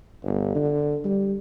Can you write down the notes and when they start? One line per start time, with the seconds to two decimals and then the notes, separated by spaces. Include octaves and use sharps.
0.24 G1
0.55 D3
1.05 G3